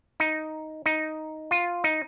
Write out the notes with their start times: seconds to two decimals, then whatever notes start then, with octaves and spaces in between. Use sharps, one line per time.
0.20 D#4
0.86 D#4
1.51 F4
1.84 D#4